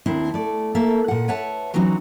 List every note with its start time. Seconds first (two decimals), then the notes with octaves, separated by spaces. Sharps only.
0.06 D#2 C4 D4 E4
0.34 A3 D5
0.75 A#3 A4 E5
1.08 A#2 F#5
1.28 B4 C#5 E5 F#5 A5
1.74 E3 F#3 C4 C#4 D#4 F#4